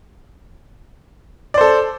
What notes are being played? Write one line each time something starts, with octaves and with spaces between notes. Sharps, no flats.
A4 C5 D5